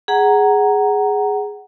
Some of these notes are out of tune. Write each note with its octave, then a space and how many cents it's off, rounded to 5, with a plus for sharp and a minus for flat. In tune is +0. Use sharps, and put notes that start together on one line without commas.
G#4 +0 F#5 +20 A#5 +0